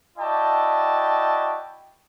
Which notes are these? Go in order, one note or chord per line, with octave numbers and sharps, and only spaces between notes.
E4 F#4 D5 D#5 G5 A5